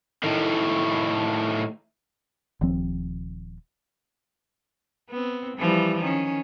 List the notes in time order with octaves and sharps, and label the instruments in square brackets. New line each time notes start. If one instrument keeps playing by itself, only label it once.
[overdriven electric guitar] A2 D#3
[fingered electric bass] D#1 D#2 F3 C4
[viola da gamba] B3 C4
E3 F3 G3
D#3 C#4